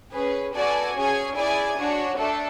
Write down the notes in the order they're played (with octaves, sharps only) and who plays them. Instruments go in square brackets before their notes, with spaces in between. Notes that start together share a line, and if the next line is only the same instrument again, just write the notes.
[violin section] C#4 G#4 B4
B3 F#4 A4 D5 G#5
C#4 G#4 C#5 G#5
E4 G#4 D5 G#5
D4 F#4 C#5
A3 D4 A4